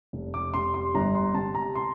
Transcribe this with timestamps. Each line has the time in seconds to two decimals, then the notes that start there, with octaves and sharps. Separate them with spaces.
0.13 F1
0.34 D6
0.53 C3 C6
0.74 C6
0.95 G1 A#5
1.15 C6
1.34 C3 A5
1.55 A#5
1.75 C6